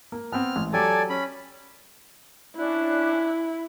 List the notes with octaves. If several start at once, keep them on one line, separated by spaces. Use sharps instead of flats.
A#3
B3 C4 F6
A1
F#3 G4 A4 D5 G#5
C#4 B5
C#4 D4 E4 F#6